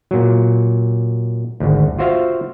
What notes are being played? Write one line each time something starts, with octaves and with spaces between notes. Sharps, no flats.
A#2 F#3
G#1 D2
F4 F#4 C5 E5 F5